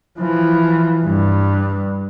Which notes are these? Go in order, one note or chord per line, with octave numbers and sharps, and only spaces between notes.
E3 F3
G2